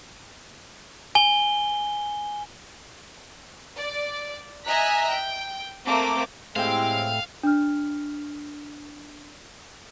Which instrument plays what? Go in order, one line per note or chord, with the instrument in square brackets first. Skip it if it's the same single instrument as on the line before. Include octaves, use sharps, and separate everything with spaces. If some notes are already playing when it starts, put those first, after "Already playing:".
[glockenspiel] G#5 G7
[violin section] D5
D#5 E5 G#5 A#5 F#6 B6
G5
A3 A#3 C4 D6
[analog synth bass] A2 [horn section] G#3 C4 [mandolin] G4 E5 G5 [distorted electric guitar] F5
[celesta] D4 F6